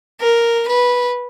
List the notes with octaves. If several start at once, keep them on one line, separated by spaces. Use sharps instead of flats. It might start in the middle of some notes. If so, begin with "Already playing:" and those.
A#4
B4